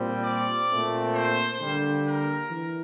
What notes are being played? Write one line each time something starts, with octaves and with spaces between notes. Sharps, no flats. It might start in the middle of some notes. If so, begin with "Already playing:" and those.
Already playing: A#2 G3 C4
D5
A#2 A3 C4
C5
D3 G3 A#3
A#4
E3